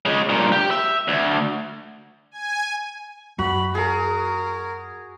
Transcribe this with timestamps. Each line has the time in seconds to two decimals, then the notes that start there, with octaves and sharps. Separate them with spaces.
0.06 C#3 G#3
0.29 G2 A#2
0.52 G4
0.71 E5
1.08 D2
2.31 G#5
3.39 F#2 F#4 B5
3.75 G#4 A#4